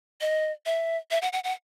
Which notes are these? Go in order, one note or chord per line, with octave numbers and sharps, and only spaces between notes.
D#5
E5
E5
F#5
F#5
F#5